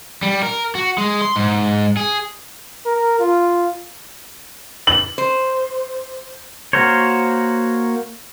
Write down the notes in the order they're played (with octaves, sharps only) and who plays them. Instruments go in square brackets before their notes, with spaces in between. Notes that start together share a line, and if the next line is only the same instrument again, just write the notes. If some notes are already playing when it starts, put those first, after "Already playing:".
[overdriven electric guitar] G3
A#4
F#4
G#3
C6
G#2
G#4
[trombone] A#4
F4
[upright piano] F#7
[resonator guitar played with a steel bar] C5
[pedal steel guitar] A#3 F#4 A#4 C5 C#5